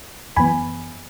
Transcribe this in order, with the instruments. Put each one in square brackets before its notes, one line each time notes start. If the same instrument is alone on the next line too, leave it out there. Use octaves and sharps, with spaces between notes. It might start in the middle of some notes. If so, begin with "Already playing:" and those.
[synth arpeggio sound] F#2 E3 B3 G#5 B5